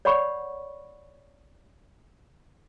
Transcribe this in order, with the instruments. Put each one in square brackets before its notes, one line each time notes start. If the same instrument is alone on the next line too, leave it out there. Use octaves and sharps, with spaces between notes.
[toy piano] C#5 D5 F#5 B5 C#6